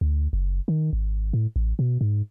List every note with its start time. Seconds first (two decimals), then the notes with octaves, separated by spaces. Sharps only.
0.01 D2
0.33 F#1
0.68 D#3
0.93 G#1
1.33 A2
1.56 A1
1.79 B2
2.01 G#2